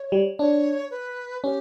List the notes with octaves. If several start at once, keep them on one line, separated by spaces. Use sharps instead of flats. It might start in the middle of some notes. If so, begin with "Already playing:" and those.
Already playing: C#5
G3
D4 C#5
B4
C#4 G4